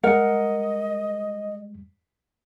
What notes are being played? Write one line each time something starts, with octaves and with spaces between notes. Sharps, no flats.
G3 G#3 A#4 D#5 F#5 C#7